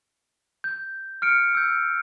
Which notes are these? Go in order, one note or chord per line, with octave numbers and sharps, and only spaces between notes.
G6
F6 C#7 D7
E6 G6